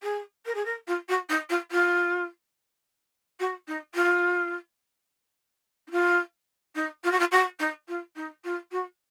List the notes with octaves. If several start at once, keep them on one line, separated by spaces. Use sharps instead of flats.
G#4
A#4
G#4
A#4
F4
F#4
D#4
F4
F4
F#4
D#4
F4
D#4
F4
D#4
F4
F#4
F4
F#4
D#4
F4
D#4
F4
F#4